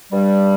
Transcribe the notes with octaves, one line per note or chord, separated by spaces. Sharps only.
G2 G3